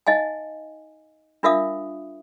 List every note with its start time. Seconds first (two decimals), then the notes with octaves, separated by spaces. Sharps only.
0.07 D#4 D#5 F5 G#5
1.43 D4 F4 A#4 E5 F5 D#6